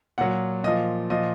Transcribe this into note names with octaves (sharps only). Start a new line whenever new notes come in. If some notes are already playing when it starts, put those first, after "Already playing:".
A#2 F#3 F#5
A#2 F3 D#5
A#2 F3 D#5